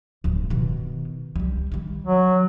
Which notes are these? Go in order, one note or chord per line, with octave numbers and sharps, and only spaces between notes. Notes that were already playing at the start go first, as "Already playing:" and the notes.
D1 G1
B2 D#3
C2 G3
D#3 G3
F#3